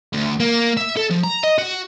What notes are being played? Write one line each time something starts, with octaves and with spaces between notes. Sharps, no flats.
D2
A#3
E5
A4
F3
A#5
D#5
F#4